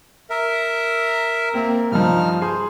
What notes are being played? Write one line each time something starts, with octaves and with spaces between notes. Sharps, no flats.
A#4 E5
A#3 C4
G2 F3 D#4 F6
G#4 C5 C6